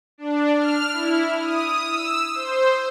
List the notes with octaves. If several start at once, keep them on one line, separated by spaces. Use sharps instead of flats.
D4
F6
E4
D#6
E6
C5